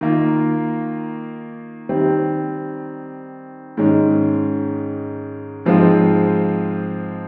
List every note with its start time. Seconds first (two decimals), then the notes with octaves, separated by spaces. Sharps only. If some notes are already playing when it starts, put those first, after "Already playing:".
0.01 D#3 A#3 F4
1.89 D#3 G3 C4
3.77 G#2 D#3 G#3 C#4
5.65 G#2 F3 G#3 C4 F4